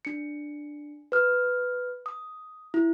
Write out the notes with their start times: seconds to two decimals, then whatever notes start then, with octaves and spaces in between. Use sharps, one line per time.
0.05 D4 C#7
1.12 B4 F6
2.06 D#6
2.74 E4